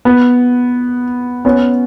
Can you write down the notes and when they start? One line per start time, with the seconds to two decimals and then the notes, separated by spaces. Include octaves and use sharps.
0.05 B3
1.45 B3 C#4